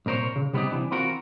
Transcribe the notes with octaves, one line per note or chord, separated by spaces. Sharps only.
C2 A#2 A#4 C5 C#5
C#3
C3 G3 B3 C#4 D#4 G4
C3 E3 D4
E3 C4 F4 F#4 A#4